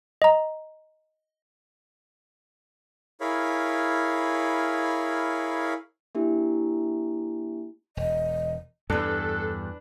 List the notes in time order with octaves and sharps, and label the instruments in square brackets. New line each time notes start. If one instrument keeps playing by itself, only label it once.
[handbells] D#5 A#5
[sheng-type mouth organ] E4 G#4 A#4 C#5 F5 B5
[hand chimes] A#3 D4 E4 G4
[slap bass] E1 [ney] D#5
[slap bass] E2 G2 [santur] D4 B4 [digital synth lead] A4